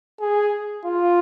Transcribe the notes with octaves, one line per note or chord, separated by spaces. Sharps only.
G#4
F4